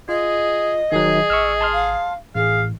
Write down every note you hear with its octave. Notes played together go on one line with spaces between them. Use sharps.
F4 G#4 D#5
D#1 D#3 F#3 G#4
A1 C#6 E6 F6
A5 C6 F6
F5
A1 A2 G#4 F5